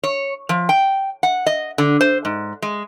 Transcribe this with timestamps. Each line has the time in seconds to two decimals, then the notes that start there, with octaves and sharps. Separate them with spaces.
0.04 C#5
0.49 F3
0.69 G5
1.23 F#5
1.46 D#5
1.78 D3
2.01 C5
2.25 G#2
2.62 G#3